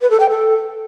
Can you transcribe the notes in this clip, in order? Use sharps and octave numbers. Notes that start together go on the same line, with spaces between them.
B4
A4
G5
A4